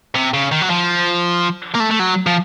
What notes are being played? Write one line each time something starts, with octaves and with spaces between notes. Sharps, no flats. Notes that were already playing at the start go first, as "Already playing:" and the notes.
C3
C#3
D#3
F#3
F3
A#3
A3
A3
F#3
F3